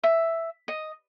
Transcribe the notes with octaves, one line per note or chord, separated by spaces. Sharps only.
E5
D#5